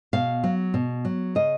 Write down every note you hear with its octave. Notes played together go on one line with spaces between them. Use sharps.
B2 F5
F#3
B2
F#3
C#3 D#5